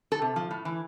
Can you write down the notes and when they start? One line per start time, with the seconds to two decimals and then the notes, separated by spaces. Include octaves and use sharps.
0.12 A4
0.22 C3
0.36 F3
0.51 A2
0.65 E3